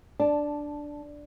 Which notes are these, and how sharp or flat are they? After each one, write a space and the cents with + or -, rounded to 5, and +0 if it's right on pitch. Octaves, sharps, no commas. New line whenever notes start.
D4 +0 A5 -5